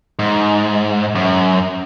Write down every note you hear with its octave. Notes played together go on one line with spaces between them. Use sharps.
G#2
F#2